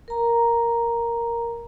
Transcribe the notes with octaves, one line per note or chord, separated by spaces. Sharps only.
A#4 A#5